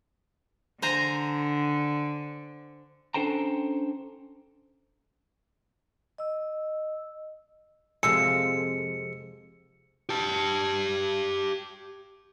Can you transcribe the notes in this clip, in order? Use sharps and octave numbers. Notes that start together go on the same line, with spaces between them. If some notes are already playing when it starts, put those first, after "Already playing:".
D3 C5 G#5 A#5
C#4 D4 A4 C5 G5 A#5
D#5 E6
F2 C3 G#3 E6 C#7
G4 A5